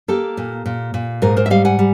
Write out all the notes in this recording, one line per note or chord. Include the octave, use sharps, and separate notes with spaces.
A#3 G4 A4
A#2
A#2
A#2
G#2 G#4 A#4
A#4 C5
E5
G3 D#5 F5
F#5 G#5
G3